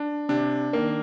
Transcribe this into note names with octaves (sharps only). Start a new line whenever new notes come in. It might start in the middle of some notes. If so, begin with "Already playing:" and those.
Already playing: D4
C3 D4
D#3 A#3